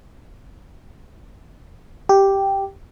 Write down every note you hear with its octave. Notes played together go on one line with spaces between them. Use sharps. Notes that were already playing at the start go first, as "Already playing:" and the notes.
G4